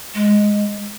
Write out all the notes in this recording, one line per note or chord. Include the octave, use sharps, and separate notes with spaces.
G#3